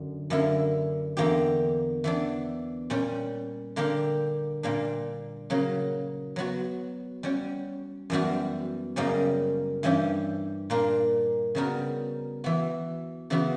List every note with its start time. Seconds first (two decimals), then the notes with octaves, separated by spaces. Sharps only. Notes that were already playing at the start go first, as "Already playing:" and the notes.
Already playing: F#2 D3
0.30 F#2 D3 A#3 E4
1.17 E2 D3 A#3 D4 G4
2.04 E3 B3 D4
2.90 A#2 G3 C#4
3.76 D3 A#3 D4 G4 A#4
4.63 A#2 G3 A#3 D4
5.50 C#3 F#3 A#3
6.36 F#3 B3 F#4
7.23 G3 C#4 F#4
8.10 F#2 E3 G3 B3 F#4
8.96 F#2 C#3 G3 A#3 C#4
9.83 G2 E3 G3 C#4 G4
10.70 A#2 A#3 D4 A#4
11.55 C#3 G3 B3 F#4 A#4
12.44 E3 B3 F#4
13.30 C#3 E3 B3 F#4